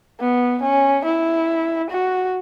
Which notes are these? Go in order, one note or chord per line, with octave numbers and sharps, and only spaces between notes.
B3
C#4
E4
F#4